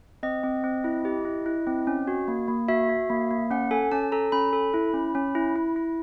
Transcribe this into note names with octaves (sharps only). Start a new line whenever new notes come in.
C4 D#5
C4
C4
E4
G4
E4
E4
C4
C#4
F#4
A#3
A#3
F#4 E5
F#4
A#3
A#3
C#4 F#5
A4 G#5
C#4 A5
A4 A#5
C#4 B5
A4
E4
C#4
C#4
E4
E4
E4